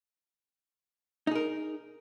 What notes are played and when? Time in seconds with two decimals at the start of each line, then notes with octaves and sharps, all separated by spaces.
1.27 D#4
1.31 G#4
1.35 A#4